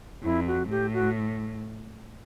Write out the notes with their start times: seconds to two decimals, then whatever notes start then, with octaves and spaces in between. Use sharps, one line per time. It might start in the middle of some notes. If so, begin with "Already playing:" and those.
0.23 F2 E4
0.47 F#4
0.70 A2 G4
0.93 F#4